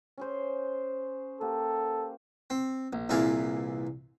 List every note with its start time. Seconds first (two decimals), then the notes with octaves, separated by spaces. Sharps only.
0.17 C#4 G#4 C5
1.41 A#3 G4 A4
2.50 C4
2.93 A#1
3.09 C2 A#2 E3 G#4 D5 F5